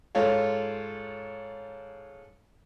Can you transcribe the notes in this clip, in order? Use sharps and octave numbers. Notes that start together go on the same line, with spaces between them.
G#2 F4 A4 C#5 F5